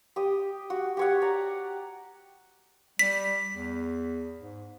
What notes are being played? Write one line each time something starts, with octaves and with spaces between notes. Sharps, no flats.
G4 D#6
F#4
G4 C#5 F#5
D5 A#5
G3 B6
E2
G#2